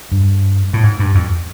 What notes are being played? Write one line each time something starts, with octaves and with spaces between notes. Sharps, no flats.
G2
A2
G#2
G2
F2